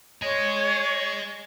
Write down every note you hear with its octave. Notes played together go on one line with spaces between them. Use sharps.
C#5 D#5 G#5